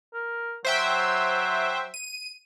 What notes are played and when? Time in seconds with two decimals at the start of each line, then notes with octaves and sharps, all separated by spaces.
0.13 A#4
0.65 F#3 C5 E5 G5
1.94 D#7